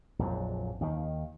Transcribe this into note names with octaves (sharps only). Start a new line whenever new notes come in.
A#1 F2 G#2 F#3
D#2 D#3